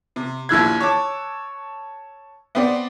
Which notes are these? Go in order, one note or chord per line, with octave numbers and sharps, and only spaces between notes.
C3
A#1 D#2 E4 E6 F#6 G#6
C#5 A5 D6
B3 C4 D5